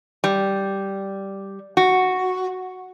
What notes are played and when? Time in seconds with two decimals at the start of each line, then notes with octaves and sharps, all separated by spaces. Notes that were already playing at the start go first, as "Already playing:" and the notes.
0.24 G3
1.77 F#4